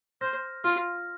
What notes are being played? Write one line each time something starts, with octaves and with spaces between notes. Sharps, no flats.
C5 F6 A#6
F4 F6